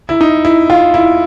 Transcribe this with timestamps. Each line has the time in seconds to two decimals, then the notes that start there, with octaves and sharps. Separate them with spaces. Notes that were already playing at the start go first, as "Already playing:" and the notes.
0.09 E4
0.21 D#4
0.45 E4
0.70 F4
0.94 E4